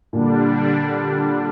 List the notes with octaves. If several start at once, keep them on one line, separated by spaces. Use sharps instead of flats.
A#2 D3 G3 D4